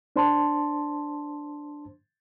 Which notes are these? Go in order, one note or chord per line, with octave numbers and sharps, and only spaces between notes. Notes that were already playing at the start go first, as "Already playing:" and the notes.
D4 C5 A5 C6